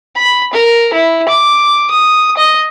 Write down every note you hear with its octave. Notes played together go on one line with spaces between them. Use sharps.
B5
A#4
E4
D6
D#6
D#5